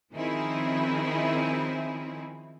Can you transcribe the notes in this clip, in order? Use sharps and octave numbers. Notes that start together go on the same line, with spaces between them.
D#3 F3 C4 C#4 E4 G#4